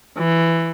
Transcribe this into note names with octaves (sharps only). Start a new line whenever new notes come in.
E3